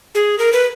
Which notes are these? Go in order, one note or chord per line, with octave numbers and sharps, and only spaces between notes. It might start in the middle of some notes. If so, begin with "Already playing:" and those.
G#4
A#4
B4